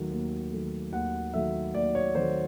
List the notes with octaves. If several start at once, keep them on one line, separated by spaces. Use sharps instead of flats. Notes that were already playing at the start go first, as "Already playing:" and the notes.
Already playing: D#2 D#3 F#3 A3
D#2
D#3 F#3 A3
D#2 F#5
D#3 F#3 A3 E5
D#2 D5
C#5
D#3 F#3 A3 C5